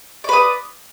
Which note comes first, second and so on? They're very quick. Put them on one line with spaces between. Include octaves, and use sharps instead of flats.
D5 B4 D#6